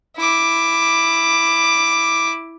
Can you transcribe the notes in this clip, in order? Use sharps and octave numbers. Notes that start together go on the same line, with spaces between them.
E4 D6